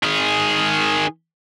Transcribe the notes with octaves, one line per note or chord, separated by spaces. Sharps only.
D#3 G#4